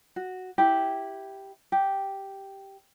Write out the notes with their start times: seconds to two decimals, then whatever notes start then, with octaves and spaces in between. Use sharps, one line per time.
0.16 F#4
0.58 E4 G4
1.72 G4